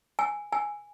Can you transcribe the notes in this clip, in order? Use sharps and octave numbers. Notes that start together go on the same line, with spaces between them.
G#5
G#5